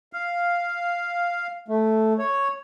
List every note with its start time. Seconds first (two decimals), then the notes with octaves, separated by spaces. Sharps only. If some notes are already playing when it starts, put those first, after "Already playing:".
0.13 F5
1.68 A3
2.19 C#5